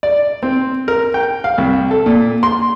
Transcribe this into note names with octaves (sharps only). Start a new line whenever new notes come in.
D5
C4
A#4
G5
F5
C2
A4
A#2
C6